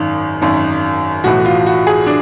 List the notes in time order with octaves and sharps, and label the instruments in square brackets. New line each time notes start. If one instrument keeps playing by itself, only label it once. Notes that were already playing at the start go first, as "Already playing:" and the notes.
Already playing: [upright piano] G#1 F#2 D#3
G#1 F#2 D#3
B1 A2 E3 F#4
F4
F#4
G#4
D4